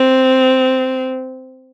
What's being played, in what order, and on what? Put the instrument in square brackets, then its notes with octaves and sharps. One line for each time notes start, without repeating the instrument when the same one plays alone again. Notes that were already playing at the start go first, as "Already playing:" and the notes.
Already playing: [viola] C4